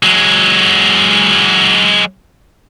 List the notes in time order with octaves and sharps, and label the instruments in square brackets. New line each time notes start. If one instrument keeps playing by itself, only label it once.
[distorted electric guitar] F#3 G#3